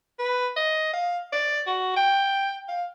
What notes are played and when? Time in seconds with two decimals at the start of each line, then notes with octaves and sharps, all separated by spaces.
0.19 B4
0.57 D#5
0.93 F5
1.33 D5
1.67 F#4
1.97 G5
2.69 F5